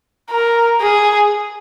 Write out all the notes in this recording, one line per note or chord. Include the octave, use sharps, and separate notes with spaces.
A#4
G#4